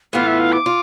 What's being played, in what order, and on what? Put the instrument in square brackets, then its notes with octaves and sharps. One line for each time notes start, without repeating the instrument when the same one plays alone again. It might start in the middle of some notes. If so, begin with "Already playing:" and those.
[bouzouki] A2 E3 B3 F4 [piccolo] F5
[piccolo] E5
F5
D6
[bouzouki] F4